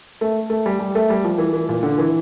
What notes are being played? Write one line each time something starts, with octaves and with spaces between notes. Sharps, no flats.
A3
A3
G3
G3
A3
G3
F3
E3
E3
A#2
D3
E3